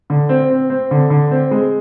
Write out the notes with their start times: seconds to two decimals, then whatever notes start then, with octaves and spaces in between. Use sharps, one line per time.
0.10 D3
0.29 C4
0.50 C4
0.70 C4
0.91 D3
1.10 D3
1.31 C4
1.51 G#3